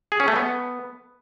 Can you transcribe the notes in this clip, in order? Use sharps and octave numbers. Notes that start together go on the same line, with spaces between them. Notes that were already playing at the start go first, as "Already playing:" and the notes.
G#4
C#4
A3
B3